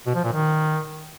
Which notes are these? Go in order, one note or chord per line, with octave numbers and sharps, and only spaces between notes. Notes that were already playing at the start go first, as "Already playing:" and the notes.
B2
F3
A#2
D#3